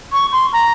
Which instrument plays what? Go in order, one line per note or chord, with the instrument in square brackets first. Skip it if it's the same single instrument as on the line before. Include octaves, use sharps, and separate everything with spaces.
[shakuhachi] C#6
C6
A#5